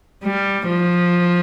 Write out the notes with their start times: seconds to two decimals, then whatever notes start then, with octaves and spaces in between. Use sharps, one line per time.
0.25 G3
0.69 F3